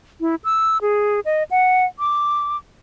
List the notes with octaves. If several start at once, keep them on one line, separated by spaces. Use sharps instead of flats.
E4
E6
G#4
D#5
F#5
D6